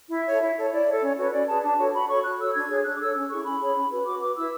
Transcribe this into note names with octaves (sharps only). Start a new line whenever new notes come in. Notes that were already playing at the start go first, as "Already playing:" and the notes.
E4 E5
A4 C#5
E4
A4 C#5
E4 D5
A4 C#5
C#4 C#5
F#4 B4 C#5
C#4 D5
G#4 B4 A5
D4 A5
F#4 A4 C#5
F#4 B5
A4 C#5 C#6
F#4 F#6
A4 C#5 E6
D4 G#6
G#4 C#5
D4 F#6
D6
A4 C#5 E6
C#4
E4 G#4 C#6
C#4 B5
G#4 C#5
C#4
F#4 B4
F#4 D6
B4 D6
E4 E6